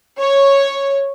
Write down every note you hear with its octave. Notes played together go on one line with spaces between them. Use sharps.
C#5